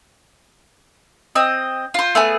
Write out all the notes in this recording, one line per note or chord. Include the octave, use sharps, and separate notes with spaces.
C4 D#5
F4 C5
A3 B3 G#4